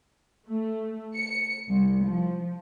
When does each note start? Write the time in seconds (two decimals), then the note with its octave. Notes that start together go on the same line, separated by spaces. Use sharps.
0.48 A3
1.15 C#7
1.70 C2
2.05 F3